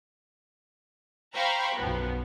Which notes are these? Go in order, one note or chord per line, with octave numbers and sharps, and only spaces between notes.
C5 F5 G5 A#5 B5 C#6
B1 F#2 F3 B3